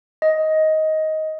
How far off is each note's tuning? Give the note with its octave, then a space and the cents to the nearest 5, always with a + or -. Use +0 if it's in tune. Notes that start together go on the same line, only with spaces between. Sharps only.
D#5 +15